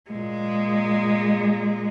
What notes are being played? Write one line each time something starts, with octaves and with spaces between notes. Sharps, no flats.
A#2 G#3